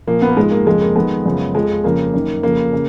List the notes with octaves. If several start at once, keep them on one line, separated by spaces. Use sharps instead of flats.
A#2 F3 A#3
B3
A#3
G#2 F3 G#3
A#3
F2 C#3 F3 G#3
A#3
F2 D#3 G#3 B3
F#2 C#3 F3
F2 F3 G#3
F2 C#3 F3 A#3
F#2 D#3
F2 C#3 F3 A#3
C#3